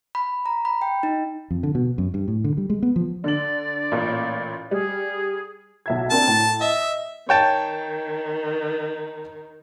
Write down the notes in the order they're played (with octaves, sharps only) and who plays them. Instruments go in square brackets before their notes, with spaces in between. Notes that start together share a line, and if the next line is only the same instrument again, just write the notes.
[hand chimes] B5
A#5
B5
G5
D#4
[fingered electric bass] F2
D3
B2
F#2
G2
A2
D3
G3
G#3
B3
F3
[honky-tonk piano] D3 F#7 [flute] D5
[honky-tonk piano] A1 A#2
[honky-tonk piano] G3 [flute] G#4
[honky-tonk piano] B1 E5 G#6
[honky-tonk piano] A#3 C4 D4 [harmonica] A5
[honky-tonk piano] A2
[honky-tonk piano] D#5 [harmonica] E5
[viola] D#3 [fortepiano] C#5 G5 A5